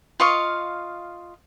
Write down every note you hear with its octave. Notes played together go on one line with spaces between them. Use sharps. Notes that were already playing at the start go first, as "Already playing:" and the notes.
F4 D#5 F5 C#6